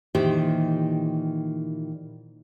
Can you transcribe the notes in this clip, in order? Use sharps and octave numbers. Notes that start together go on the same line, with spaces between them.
A#2 D#3 E3 G4 C5 G5